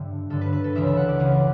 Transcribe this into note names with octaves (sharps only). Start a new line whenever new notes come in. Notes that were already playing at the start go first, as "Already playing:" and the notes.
Already playing: G2 D3 E5 G5
G2 D3 A4
B4
B4
A4
C#2 C#3 E3 E5
E5
F#5
D5
C#2 C#3 E3